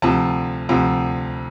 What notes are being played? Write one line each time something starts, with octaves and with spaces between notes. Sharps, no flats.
D2 C3 F3 A5
D2 C3 F3